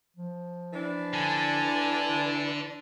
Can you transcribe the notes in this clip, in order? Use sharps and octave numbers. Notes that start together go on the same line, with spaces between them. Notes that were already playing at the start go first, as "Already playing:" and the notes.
F3
E3 D4
D3 G#5 A5